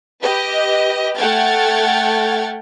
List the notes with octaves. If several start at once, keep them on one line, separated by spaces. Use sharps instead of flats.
G4 B4 D#5
A3 F#5 G5 F6 G#6 A6